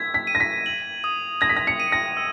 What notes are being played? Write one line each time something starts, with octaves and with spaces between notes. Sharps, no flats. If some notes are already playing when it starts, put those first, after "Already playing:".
Already playing: E6 G#6 B6
B6
D#7
A#6
B6
F#7
D#6
G#6 A#6
B6
A#6
C#7
D#7
A#6
E6